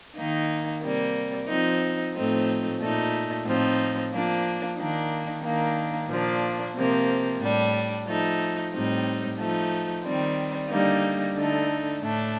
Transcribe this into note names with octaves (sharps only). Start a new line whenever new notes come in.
D#3 A#3 D#4
C3 G3 A#3
F3 C4 D#4
A2 F3 A3 C4 D#4
A#2 A3 D#4
A2 F3 C4 D#4
F3 A#3 D4
D#3 A#3 D4
D#3 A#3 D4
A#2 F3 A#3 D4
C3 F3 A#3
A2 G3 D4
F3 A3 D#4
A2 G3 C4 D#4
F3 A3 D#4
D#3 G3 C4
D3 G3 A#3 D#4
D3 A3 D#4
A2 A3 D4